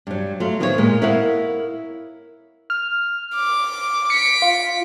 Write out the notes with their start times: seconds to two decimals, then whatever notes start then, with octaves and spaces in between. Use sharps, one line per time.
0.07 G2 F#3
0.40 F#3 A3 F4
0.60 D#3 F3 B3 F4 G4 C#5
0.78 A#2 G#3 A#4
1.02 E4 A#4 C#5 D#5 F5 F#5
2.70 F6
3.35 D6
4.10 B6 C#7 D7
4.42 F4